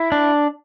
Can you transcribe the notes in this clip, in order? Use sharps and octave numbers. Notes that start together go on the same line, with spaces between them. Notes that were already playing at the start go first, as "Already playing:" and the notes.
Already playing: E4
D4